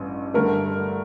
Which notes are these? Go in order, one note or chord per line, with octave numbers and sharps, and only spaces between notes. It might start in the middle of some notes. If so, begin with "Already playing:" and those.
Already playing: A1 G2
G2 D3 A3 A#4